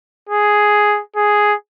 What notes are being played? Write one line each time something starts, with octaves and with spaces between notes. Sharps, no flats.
G#4
G#4